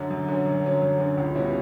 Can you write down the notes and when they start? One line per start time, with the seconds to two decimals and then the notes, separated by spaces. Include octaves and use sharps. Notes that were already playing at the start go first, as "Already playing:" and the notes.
Already playing: F#2 D3 F#3 C#4
0.10 F#2
0.28 D3 F#3 C#4
0.45 F#2
0.64 D3 F#3 C#4
0.82 F#2
0.99 D3 F#3 C#4
1.17 C#2
1.35 B2 G3 C#4 E4